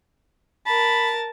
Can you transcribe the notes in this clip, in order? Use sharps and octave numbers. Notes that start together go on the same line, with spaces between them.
A#4 A5 B5